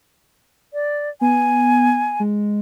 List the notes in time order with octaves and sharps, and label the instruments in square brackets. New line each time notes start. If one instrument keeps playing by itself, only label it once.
[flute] D5
[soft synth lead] B3 [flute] G#5
[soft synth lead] G#3